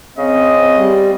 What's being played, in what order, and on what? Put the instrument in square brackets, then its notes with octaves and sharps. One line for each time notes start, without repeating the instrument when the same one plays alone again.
[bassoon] C#3 [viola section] C4 [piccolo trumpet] D#5
[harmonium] G3